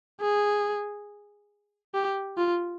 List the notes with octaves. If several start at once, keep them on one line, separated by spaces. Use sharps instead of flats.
G#4
G4
F4